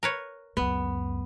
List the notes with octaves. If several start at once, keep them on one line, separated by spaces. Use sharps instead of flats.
A#4 B4 C#5
C#2 F#2 B3